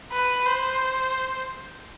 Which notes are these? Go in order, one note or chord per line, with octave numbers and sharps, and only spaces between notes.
B4
C5